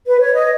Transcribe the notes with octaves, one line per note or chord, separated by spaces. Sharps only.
B4
C#5
D#5